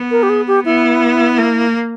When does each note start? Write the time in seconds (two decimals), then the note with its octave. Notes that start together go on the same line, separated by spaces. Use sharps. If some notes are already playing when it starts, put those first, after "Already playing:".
Already playing: B3
0.11 A#4
0.23 G4
0.29 G#4
0.47 G4
0.65 B3 E4
1.38 A#3